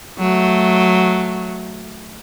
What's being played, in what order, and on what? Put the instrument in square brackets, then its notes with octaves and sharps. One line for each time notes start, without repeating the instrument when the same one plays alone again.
[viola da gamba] F#3 A3